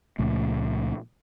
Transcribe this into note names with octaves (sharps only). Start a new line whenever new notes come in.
C#2 A#2 F3 A3